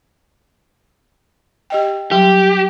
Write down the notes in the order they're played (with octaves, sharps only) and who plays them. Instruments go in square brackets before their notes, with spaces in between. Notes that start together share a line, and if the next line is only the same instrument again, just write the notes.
[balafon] G4 D#5 G5
[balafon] F#3 G3 C6 [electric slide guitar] G4